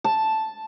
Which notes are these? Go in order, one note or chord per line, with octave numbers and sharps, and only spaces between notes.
A5